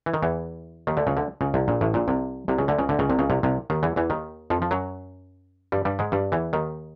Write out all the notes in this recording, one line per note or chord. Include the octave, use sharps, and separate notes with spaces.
E3
D#3
E2 E3
D#2 D#3
D2 D3
C#2 C#3
D2 D3
C#2 C#3
C2 C3
A#1 A#2
A1 A2
A#1 A#2
C2 C3
C2 C3
C#2 C#3
D2 D3
C#2 C#3
D2 D3
C#2 C#3
C2 C3
C#2 C#3
C2 C3
C2 C3
D#2 D#3
E2 E3
E2 E3
D#2 D#3
F2 F3
F3
F#2 F#3
G2 G3
G2 G3
G#2 G#3
G2 G3
E2 E3
D#2 D#3